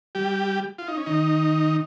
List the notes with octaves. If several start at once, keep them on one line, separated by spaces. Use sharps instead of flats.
G3 G4
F4
D#4
C#4
D#3 D#4